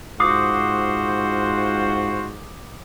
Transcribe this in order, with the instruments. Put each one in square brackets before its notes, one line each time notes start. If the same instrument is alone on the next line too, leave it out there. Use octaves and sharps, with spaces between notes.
[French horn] G#2 [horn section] F4 F#4 C5 [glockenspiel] D6 D#6 C7